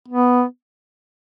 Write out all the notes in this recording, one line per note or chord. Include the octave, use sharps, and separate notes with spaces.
B3